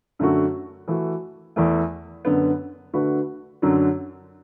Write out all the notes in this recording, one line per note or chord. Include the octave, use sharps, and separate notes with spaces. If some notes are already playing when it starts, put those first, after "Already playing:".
F#2 D3 A3 F#4
E3 A3 F#4
E2 E3 A3
F#2 D3 B3
D3 A3 F#4 B4
F#2 D3 F#3